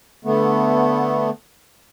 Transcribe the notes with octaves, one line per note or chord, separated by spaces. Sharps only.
D3 A3 B3